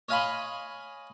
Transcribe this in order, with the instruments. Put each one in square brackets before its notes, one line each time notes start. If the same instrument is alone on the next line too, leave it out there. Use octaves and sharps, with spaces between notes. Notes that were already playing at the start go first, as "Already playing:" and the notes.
[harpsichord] C#5 D#5 F5 G#5 B5 C6